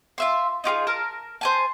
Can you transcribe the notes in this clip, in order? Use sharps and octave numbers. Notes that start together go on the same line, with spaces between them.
F4 E5 C6
D#4 F4 G4 G#4
A#4 A5 F6
C5 G#5 A5